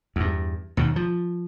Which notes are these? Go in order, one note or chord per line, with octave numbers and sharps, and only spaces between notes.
E2 G2
D#2 B2 D#3
F3